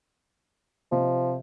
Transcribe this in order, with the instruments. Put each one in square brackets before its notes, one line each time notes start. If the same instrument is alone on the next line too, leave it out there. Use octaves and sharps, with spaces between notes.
[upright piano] C3 D#5 [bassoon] F3